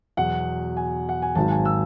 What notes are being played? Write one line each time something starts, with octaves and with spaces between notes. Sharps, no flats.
E2 B2 F#3 F#5
G#5
F#5
G#5
G#1 G#2 D#3 F#3 A5
G#5
E6